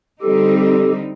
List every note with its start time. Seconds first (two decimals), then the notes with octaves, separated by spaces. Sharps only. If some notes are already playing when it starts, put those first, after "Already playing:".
0.22 D3 G3 C4 D#4 G4 A4
0.59 G4 A4